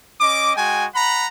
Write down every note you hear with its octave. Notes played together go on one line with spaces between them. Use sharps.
C#4 D#5 D6
G#3 F#4 G5 G#5
F#5 A#5 B5